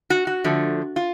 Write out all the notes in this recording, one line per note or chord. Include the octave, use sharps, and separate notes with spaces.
F#4
F#4
D3 F3 A3
F4